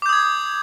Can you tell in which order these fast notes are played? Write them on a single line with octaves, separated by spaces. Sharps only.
D6 G6 D#6 G#6